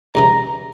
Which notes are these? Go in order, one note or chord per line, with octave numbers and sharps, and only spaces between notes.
D#2 C#3 E3 A#5